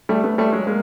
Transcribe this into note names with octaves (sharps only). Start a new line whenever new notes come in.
G3 A3
A3 B3
G3 A3
F#3 G#3
G#3 A#3